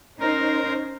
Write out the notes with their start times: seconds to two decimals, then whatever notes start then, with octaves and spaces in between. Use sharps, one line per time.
0.20 C#4 D#4 A#4 C5